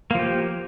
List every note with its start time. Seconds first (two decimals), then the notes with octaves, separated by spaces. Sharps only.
0.11 A#3
0.15 F3
0.19 G4